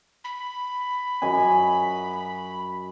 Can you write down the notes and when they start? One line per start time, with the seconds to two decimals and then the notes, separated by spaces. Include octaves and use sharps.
0.24 B5
1.22 F#2 D#5 G#5